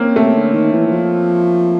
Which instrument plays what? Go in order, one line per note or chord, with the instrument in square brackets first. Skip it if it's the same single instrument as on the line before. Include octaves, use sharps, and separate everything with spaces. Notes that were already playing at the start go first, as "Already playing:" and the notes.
Already playing: [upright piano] A#3 C4 C#4
[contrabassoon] C3 [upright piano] A3
[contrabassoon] D3
D#3
E3
E3
F3